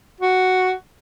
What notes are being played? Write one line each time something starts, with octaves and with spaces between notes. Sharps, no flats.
F#4